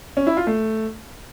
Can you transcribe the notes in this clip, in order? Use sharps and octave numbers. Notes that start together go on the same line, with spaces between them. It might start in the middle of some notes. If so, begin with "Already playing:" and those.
C#4
E4
F4
A3